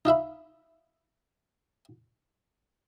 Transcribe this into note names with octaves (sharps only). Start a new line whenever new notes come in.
D#4 F4 E5 B5